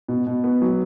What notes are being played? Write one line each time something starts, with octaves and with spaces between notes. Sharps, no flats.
B2
B2
B3
F#3